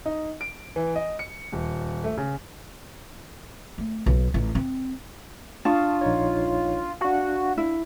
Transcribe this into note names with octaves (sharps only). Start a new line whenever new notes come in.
D#4
D7
E3
D#5
C#7
D#1
A3
C#3
A3
B1
A1
C4
D4 F4 A5 C#6 D#6
A#1 D#4 C#5
D4 F#4 F5
E4